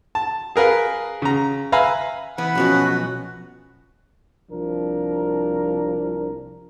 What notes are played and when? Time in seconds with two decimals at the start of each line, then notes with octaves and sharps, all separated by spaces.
0.15 A5
0.56 G#4 A#4 B4 F5
1.22 C#3 A#5
1.72 B4 E5 F5 G#5 A#5 B5
2.38 E3 F#5 B5
2.55 B1 F3 B3 C#4 F#4
4.51 C2 F3 D4 A#4